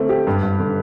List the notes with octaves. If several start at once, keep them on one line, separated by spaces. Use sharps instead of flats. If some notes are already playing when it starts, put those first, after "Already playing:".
Already playing: D3 A3 C4
G4
G2
G2
D3